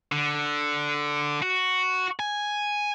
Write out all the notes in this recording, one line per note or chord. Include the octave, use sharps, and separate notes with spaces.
D3
F#4
G#5